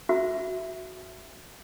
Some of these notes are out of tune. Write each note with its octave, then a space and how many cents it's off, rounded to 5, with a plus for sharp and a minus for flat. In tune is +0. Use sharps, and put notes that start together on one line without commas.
F#4 +0 E5 +0